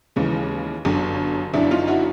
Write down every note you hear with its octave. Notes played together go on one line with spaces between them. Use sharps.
D#2 C#3 E3 G#3 C#4
G1 F#2 D3
G1 F#2 D3 D4 E4
D#4 F4
E4 F#4